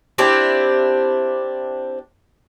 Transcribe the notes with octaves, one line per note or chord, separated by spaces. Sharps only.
C4 D4 E4 G4